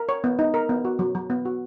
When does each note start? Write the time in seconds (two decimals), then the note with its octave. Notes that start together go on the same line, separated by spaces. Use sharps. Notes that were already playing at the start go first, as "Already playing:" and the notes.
Already playing: A#4
0.09 C#5
0.24 B3
0.39 D#4
0.54 A#4
0.69 B3
0.85 F#4
0.99 F#3
1.15 F#3
1.30 B3
1.45 F#4